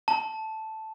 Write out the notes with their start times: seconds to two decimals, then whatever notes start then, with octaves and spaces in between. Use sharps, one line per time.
0.08 A5